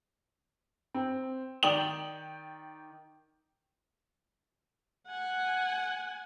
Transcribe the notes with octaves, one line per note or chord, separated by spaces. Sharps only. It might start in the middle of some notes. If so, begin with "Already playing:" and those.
C4
D#3 D5 G5 D#6 F#7
F#5 G#5